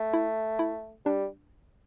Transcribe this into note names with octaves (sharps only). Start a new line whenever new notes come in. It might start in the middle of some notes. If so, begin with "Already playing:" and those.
Already playing: A3
E4
E4
G3 D4